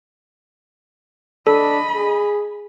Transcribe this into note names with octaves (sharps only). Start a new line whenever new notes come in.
D4 A4 D#5 B5
G#4